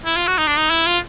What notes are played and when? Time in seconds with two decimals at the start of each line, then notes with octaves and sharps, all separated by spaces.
0.05 E4
0.16 F4
0.27 F#4
0.38 D#4
0.47 D4
0.58 D#4
0.70 E4
0.87 F4